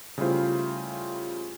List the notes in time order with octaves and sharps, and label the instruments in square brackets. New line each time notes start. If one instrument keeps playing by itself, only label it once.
[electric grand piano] C#3 G3 A3 E4 F4 C5